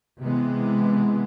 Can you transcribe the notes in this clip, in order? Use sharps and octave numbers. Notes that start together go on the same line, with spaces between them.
C3 E3 G#3 B3